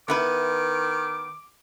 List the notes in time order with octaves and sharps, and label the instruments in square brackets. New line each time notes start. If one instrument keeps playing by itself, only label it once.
[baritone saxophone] D#3 [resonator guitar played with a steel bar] B3 E4 B4 [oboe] D6